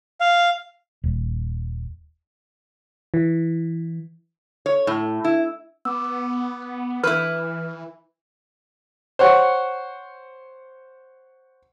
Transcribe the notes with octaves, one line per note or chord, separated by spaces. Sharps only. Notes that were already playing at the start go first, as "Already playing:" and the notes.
F5
D#1
E3
C#5
A2
E4
B3 D6 E6
E3 E4 B4 F6
C5 C#5 F#5